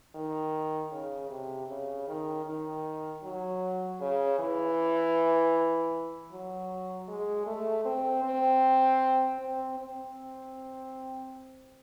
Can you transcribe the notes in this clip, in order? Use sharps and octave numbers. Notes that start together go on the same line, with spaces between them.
D#3
C#3
C3
C#3
D#3
D#3
F#3
C#3
E3
F#3
G#3
A3
C4
C4
C4
C4